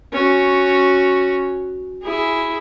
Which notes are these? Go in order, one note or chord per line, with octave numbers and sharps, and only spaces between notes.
C#4 F#4
E4 G#4